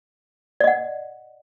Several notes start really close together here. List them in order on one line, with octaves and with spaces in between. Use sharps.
D5 D#5 F#5